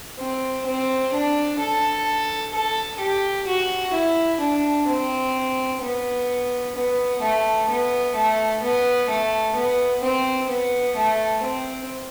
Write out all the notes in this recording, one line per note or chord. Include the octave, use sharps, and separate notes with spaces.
C4
C4
D4
A4
A4
G4
F#4
E4
D4
C4
B3
B3
A3
B3
A3
B3
A3
B3
C4
B3
A3
C4